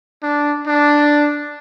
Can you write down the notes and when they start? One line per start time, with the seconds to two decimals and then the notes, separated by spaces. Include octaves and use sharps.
0.22 D4
0.66 D4